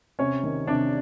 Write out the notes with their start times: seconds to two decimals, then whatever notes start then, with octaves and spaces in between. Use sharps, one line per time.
0.19 C3 C#4 C#5
0.43 D#3
0.67 C3 D4 D5